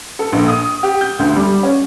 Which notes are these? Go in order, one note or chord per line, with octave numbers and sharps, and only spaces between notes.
A4
A#1
D#6
G4
G6
D2
G3
C#4